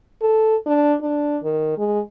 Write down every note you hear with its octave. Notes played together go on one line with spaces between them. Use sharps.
A4
D4
D4
D#3
G#3